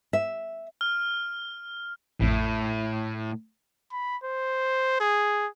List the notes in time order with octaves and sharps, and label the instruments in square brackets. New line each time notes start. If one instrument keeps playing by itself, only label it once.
[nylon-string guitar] E5
[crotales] F6
[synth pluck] A1 F2 [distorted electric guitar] A2
[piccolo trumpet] B5
C5
G#4